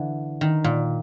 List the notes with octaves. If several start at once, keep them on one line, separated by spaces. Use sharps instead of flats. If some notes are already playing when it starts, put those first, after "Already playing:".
Already playing: D3 E3
D#3
A#2